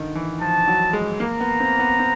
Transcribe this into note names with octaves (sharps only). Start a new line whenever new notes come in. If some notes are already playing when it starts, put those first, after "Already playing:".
Already playing: D3 D#3
E3
F3 A5
F#3
G#3
A#3 A#5
B3
C4
B3
C4